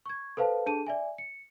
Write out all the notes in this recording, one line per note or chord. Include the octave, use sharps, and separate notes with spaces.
C#6 G#6
A4 B4 C5 F5 A5
D4 G#4 A4 A5 D#7
D5 E5 G#5
C#7